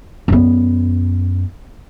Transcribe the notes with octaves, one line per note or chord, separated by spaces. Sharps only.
F#2 B3